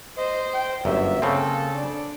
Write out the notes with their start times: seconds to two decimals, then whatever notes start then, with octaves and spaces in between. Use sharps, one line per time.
0.18 C5 D#5
0.54 G5
0.85 G1 F#2 A#3 E5
1.22 C#3 C4 A4
1.74 D4